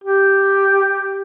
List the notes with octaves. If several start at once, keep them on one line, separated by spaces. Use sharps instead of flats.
G4